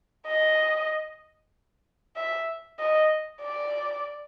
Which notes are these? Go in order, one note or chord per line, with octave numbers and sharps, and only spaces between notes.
D#5
E5
D#5
D5